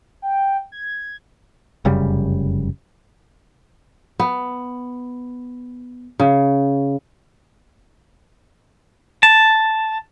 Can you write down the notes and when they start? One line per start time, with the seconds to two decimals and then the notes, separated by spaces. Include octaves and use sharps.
0.22 G5
0.72 G#6
1.85 F1 F#2 C#3 G3
4.20 B3
6.20 C#3
9.23 A5